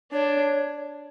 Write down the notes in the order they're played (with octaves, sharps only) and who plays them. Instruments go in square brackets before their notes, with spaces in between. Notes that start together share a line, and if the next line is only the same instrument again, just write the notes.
[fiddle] D4 [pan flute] C#5